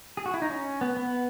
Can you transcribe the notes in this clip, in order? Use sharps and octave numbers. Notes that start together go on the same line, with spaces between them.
G#4
F#4
E4
D#4
C#4
B3
B3